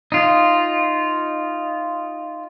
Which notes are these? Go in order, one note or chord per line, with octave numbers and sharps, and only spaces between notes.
D#4 F4